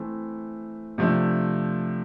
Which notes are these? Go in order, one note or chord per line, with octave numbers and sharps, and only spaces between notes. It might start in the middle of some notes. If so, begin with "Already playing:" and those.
Already playing: E3 A3 C4
C3 F3 A3 D4